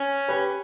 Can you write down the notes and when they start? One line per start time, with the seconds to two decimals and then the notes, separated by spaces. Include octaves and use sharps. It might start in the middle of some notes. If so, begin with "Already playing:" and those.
Already playing: C#4
0.29 G4 B4